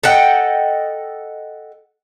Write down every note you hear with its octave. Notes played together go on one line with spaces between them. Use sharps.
A4 D#5 F#5 G5